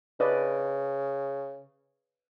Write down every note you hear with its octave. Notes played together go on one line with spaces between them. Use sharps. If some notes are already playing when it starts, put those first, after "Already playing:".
C#3 B4 D5 D#5